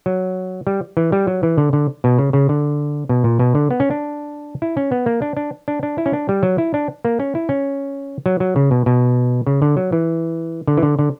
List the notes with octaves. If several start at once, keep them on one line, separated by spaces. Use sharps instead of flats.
F#3
G3
E3
G3
F#3
E3
D3
D3
B2
C#3
C#3
D3
B2
A#2
B2
D3
B3
C#4
D4
E4
C#4
B3
A#3
D4
D4
D4
D4
E4
C#4
D4
G3
F#3
E4
D4
A#3
C#4
E4
C#4
F#3
F#3
C#3
B2
B2
C#3
D3
F#3
E3
D3
E3
D3
D3